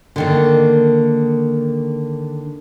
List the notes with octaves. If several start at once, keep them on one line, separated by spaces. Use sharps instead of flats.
D3 D#3 A#3